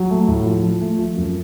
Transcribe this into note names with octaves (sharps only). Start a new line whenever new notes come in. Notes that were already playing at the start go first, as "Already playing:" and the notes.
Already playing: F#3
A3
A2
F3
F3
A3
F3
F#2